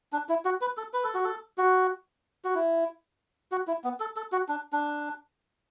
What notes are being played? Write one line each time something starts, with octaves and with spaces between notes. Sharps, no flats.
D4
E4
F#4
B4
A4
B4
A4
F#4
A4
F#4
F#4
E4
F#4
E4
B3
A4
A4
F#4
D4
D4